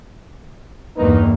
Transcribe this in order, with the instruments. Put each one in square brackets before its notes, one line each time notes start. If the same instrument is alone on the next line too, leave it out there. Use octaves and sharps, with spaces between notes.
[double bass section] E2 G2 A#3 [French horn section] D#3 D#4 B4